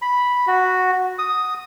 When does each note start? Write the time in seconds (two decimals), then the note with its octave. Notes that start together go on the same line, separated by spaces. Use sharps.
0.02 B5
0.47 F#4
1.19 D#6